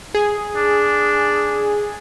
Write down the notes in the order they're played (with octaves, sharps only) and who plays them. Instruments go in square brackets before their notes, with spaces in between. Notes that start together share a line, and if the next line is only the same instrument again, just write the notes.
[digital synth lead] G#4
[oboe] D4